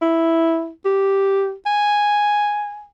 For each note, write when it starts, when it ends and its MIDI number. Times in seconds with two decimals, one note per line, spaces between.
0.02 0.70 64
0.85 1.53 67
1.66 2.87 80